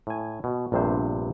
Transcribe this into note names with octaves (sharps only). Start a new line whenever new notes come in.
A2 G#5
B2
A#1 G2 C3 B3 C5